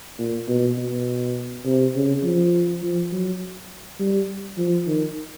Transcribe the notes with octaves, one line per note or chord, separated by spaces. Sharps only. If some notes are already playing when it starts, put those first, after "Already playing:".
A#2
B2
B2
C3
C#3
F3
F3
F#3
G3
F3
D#3